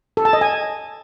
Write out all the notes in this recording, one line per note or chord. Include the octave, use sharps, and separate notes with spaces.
A4
A5
D#5
G#5